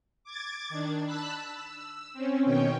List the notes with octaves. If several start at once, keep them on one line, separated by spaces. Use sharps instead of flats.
D6 G#6 A6
D#3 D4
A5 B5 E6 F#6 B6
E6
C4 C#4
B2 D#3 C#4 C#5 G5